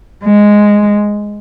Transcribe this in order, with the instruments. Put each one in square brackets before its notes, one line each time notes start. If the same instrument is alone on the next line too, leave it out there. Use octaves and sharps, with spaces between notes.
[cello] G#3